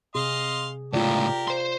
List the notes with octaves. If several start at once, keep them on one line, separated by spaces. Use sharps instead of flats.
C3 G#4 D#5 F5 C6
C#2 A2 F4 G4 A#4 D5
C5 C6